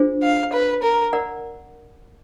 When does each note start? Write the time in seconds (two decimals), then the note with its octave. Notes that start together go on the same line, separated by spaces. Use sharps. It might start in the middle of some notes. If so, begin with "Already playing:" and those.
Already playing: D4 F4 G#4 C5
0.22 F5
0.53 B4
0.83 A#4
1.13 A#4 D5 F#5 A#5